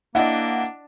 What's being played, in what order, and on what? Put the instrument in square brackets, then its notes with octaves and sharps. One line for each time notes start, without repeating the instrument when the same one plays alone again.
[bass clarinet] A#3 [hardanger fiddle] D4 [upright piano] E4 D#5 [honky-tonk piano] F#5